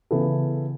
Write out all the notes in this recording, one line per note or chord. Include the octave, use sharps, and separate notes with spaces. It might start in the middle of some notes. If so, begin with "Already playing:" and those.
C#3 E3 B3 E4 A4